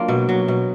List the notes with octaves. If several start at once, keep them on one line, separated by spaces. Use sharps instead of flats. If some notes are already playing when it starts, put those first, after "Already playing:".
Already playing: F#3 A#3 D4 F4
B2
F#3
B2